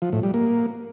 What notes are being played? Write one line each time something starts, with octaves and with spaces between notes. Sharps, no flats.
F3
A2
G3
A#3